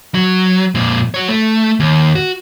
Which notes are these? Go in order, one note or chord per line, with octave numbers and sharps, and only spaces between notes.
F#3
F2 A#2
F#4 C#5
A3
D#2
F#4